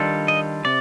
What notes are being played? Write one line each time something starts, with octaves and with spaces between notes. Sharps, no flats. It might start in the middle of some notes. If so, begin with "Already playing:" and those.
Already playing: D#3 G3 D4 F4 A4
D#5
C3 D5